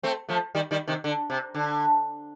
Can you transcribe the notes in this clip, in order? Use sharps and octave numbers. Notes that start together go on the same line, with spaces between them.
A3 C4
F3 A3
D#3 G3
D#3 G3
C3 D#3
D3
C3
D3